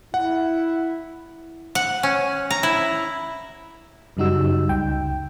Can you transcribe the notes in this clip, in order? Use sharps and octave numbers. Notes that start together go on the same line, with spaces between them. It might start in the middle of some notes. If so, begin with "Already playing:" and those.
E4 F#5
F#5
C#4
A#5
E4
F#2 C#3 G3 D#4 F#4 E6
C#2 G5